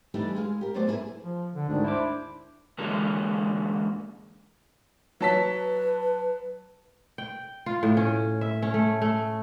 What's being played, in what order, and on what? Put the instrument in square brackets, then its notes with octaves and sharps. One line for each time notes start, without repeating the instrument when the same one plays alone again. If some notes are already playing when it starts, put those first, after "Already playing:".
[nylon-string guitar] E3 G3 A3 D4 D#4
G#3 G#4 F5
G4 A#4
F#3 A3 B3 A4 C5 D5
A#3 B3 E4 G#4 B4
[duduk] F3
D3
[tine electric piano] D2 G#2 D#3 [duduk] D4
[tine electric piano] E4 C5 D6
[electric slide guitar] F#2 D3 E3 F#3 G#3 A#3
[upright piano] F#3 A5 B6 [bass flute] B4
[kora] G5
F4
A2
C#4
E5
C#4
A3
A3